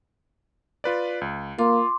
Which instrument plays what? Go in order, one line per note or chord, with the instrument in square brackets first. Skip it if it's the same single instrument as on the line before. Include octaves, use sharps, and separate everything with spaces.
[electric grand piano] F4 B4 D5
C#2
[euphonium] A#3 [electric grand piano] F4 [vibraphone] C6 D6